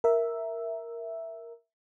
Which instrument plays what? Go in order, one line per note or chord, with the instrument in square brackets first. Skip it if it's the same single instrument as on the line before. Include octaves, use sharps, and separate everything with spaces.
[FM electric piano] A#4 E5